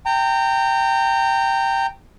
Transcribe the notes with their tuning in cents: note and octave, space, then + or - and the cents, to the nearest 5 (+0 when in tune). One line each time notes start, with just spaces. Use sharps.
G5 +0 A#5 -30